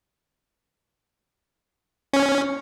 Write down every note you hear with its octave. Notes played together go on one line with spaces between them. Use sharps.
C#4